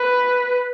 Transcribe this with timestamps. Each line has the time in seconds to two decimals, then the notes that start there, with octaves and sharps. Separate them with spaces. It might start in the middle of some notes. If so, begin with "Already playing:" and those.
Already playing: B4